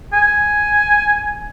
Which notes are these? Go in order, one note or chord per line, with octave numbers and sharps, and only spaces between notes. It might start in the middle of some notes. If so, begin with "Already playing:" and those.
G#5